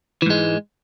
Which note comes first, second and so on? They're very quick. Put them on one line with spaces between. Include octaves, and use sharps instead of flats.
E3 G#2 G#3